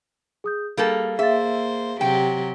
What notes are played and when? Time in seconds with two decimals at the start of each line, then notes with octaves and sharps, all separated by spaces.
0.44 G#4 D#6 G6
0.77 G3 A#3 G#4 A4
1.19 A#3 G#4 C5 E5 F5 A6
2.01 C3 F#3 G4 G5